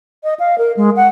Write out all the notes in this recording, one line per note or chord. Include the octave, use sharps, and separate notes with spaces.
D#5
F5
A#4
G#3
F#5